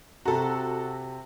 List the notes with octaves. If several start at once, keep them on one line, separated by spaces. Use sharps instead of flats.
C3 F#4 A4 A#5